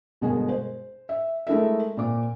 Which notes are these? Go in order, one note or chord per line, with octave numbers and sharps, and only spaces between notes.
G1 B2 G#3 A#4 G#5
C5
E5
G#3 A3 E4 A#4 E5
A#2 C4 D6